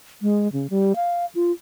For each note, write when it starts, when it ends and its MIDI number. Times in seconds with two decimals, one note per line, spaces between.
0.22 0.51 56
0.52 0.67 49
0.70 0.93 55
0.96 1.25 77
1.35 1.51 65